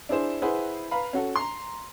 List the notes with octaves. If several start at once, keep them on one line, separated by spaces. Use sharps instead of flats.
D4 E4 G#4 C5 E7
E4 G#4 B4 C5 F#5
B4 F5 A#5 B5
C#4 F#4 A4
A#5 C6